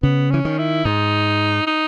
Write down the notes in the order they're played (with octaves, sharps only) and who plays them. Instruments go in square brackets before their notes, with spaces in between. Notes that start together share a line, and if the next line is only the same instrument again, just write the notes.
[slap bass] C#3 [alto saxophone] B3
[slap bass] E3 [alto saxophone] C#4
[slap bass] D#3
[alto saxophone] E4
[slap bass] G#2 [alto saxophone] D#4
[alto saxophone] D#4